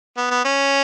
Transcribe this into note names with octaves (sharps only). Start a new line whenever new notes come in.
B3
B3
C#4